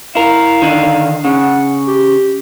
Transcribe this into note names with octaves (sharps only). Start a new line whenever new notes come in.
E4 A#4 F5
D3 D#3
C#3 F#5
G4